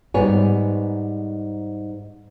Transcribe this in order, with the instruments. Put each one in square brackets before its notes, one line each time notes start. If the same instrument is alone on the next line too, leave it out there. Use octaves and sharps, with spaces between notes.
[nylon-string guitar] G#2 G3 B3 C#5 G#5